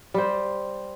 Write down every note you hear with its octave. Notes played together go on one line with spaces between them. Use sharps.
G3 C5